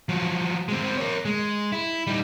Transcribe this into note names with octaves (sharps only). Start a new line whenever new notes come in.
F3 F#3
G#3 C4
A#4 C#5
G#3
E4
G3 D#4